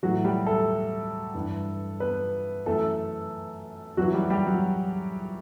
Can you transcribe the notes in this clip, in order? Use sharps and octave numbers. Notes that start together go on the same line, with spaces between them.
A2 E3 F#3 F#4
G3 G4
A3 A4
G2 E3
B3 B4
F#2 E3 A3 A4
F#2 E3 F#3 F#4
G3 G4
G3 G4
F#3 F#4